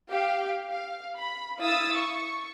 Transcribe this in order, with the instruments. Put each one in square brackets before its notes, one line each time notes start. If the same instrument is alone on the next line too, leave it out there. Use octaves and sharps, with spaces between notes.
[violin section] G4 F5
F5
B5
E4 F5 D#6 E6 A6
C#6